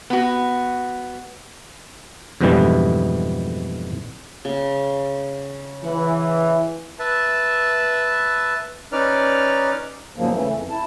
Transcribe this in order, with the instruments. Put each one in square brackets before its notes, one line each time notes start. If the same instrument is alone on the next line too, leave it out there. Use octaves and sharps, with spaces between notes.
[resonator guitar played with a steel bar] B3 F#4
[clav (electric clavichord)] F2 G#2 B2 D3 E3 G3
[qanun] C#3
[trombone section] E3 [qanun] F#5
[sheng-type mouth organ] B4 E5 A5
C#4 D#4 B4 D5 F6
[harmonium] E2 G#2 C#3 F3 F#3 A#3
C#3 E3 A3
F2
E4 A5